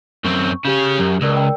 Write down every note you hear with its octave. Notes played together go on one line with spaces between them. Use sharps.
F#2 C4 C#6
C#3 C#4 G4 G6
F#2
C#2 A#4 D5 E6
G5